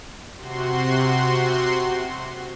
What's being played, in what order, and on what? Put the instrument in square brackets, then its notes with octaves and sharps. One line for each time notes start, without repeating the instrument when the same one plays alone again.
[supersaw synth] C3 F#4 C6